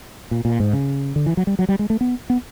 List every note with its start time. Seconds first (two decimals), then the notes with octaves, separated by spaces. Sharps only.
0.31 A#2
0.45 A#2
0.60 G#2
0.73 C#3
1.16 D3
1.26 E3
1.37 F#3
1.47 G3
1.59 F#3
1.69 G3
1.79 G#3
1.90 A3
2.01 B3
2.30 B3